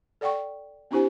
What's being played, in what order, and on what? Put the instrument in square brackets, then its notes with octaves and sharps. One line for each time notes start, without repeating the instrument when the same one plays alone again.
[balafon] A4 D5 F#5 G5 C#6
C4 D4 E4 G4 C5 G#5